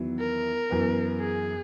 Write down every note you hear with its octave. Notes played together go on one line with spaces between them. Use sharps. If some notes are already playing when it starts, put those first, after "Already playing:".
Already playing: E2 D#3 F#3 B3 E4
A#4
F#2 E3 B3
G#4